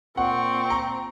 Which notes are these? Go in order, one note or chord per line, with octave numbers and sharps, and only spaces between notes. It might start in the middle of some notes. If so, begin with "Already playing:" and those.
A#2 C4 F#5 C#6
A#5